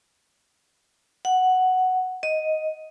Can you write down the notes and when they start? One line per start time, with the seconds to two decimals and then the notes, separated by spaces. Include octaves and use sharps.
1.25 F#5
2.23 D#5